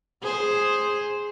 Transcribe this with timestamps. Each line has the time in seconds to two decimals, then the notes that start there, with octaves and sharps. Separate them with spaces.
0.23 G#4 C5